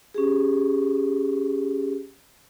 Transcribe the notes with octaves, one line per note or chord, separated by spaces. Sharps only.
C#4 G4 G#4